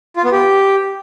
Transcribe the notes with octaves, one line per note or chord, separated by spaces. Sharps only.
F4
B3
G4